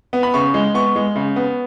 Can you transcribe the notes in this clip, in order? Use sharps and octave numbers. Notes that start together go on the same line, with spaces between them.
B3
B5
C#3 C#6
G#3
B3 C#6
G#3
C#3
B3